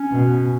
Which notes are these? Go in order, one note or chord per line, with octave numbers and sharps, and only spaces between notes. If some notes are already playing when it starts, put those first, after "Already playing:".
Already playing: C#4
B2